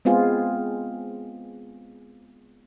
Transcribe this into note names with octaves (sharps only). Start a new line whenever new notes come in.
G#3 B3 C4 F4 G#4